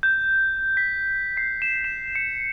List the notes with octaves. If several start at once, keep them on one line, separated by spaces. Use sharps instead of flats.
G6
B6
C7
E7
E7
C#7